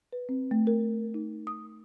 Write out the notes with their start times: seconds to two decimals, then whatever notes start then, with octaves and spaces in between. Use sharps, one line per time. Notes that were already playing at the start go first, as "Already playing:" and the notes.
0.13 B4
0.29 C4
0.51 A3
0.67 A#4
1.14 D#4
1.47 D#6